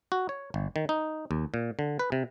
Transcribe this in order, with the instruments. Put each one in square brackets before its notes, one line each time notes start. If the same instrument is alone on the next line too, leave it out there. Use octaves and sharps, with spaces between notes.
[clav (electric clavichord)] F#4
C#5
G1
D#3
D#4
D#2
A#2
D3
B4
C3